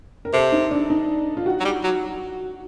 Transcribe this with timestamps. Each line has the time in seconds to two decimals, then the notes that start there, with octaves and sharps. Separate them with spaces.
0.25 A#4
0.33 C3 A4
0.52 D#4
0.71 D4
0.90 D#4
1.37 F4
1.46 F#4
1.60 F#3
1.65 G3
1.84 F#3